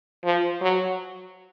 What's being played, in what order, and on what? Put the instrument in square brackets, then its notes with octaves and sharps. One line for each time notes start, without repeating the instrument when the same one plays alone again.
[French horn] F3
F#3